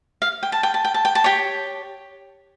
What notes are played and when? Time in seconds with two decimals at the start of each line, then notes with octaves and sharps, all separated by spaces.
0.22 F5
0.43 G5
0.52 A5
0.63 G5
0.74 A5
0.85 G5
0.94 A5
1.05 G5
1.15 A5
1.24 G4 C#5 G5